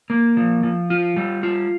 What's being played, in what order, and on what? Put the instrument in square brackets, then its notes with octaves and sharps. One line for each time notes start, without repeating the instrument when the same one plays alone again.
[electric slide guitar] A#3
F3
F3
F4
G3
F4